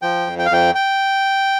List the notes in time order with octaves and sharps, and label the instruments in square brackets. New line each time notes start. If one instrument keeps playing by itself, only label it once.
[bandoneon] F3 G5
F2
G5
F5
F2 G5
G5